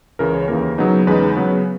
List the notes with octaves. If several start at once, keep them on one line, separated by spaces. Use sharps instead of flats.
C#2 C#3 E3 A#4
C#5
D#2 C#3 E3 A#3 A#4
C#3 F#3 B3 D#4
E2 C#3 G#3 D#4 B4
C#3 F#3 B3